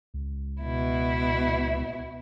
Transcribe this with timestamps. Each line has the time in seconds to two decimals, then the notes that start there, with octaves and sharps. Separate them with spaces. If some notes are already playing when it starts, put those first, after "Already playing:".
0.14 C#2
0.61 B2 E4